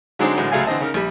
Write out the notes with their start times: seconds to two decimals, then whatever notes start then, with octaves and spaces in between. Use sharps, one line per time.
0.19 D3 F#3 G#3 C4 D4 D#4
0.37 A2 D3 E3 F#3 G#3
0.52 C#2 F#3 G#3 A3 F5 G#5
0.66 D3 E3 C4 D#5 A5
0.80 C#3 D#4 A#4
0.94 A#1 G3